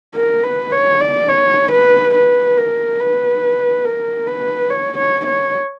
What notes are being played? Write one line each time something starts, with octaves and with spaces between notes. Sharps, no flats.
A#4
B4
C#5
D5
C#5
B4
B4
A#4
B4
A#4
B4
C#5
C#5
C#5